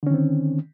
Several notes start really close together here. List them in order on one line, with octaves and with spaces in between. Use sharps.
D3 C#4 D#3 C4